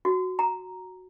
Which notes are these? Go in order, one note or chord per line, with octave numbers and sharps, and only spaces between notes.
F#4
A#5